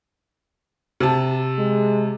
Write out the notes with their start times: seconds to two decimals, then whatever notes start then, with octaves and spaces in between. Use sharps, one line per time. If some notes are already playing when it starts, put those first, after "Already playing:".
1.00 C3 A5
1.58 G#3